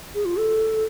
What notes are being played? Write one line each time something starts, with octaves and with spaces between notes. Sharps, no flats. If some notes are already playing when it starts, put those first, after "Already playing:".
G#4
F4
A4